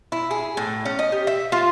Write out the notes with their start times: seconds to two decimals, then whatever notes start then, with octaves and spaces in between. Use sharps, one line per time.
0.12 E4
0.31 G#4
0.57 A2
0.85 C#4
0.99 D#5
1.12 G4
1.27 E5
1.52 F4